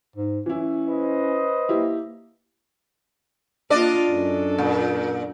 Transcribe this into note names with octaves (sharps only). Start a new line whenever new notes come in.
G#2
E3 C#4 E4
B4 C5 D#5
A#3 E4 G4
A#3 D4 F4 D5 D#5
F#2 A4
A#2